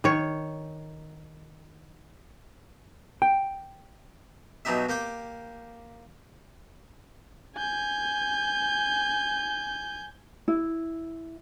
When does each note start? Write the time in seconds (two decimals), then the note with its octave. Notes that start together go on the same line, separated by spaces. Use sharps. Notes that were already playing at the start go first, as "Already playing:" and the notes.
0.04 D#3 C#5
3.22 G5
4.65 B2 F#3 D#4 G4 E5
4.89 A#3 G4 G5 D6
7.56 G#5 G6
10.48 E4